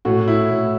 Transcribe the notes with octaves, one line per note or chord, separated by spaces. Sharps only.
A2 F#4
E4
A2